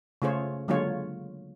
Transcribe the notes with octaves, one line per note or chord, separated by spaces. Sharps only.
C#3 A3 F4 G#4 C5 C#5
D3 F#3 G#3 A#3 F4 C#5